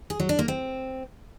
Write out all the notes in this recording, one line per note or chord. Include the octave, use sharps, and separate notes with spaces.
G#4
F#3
D4
A#3
C4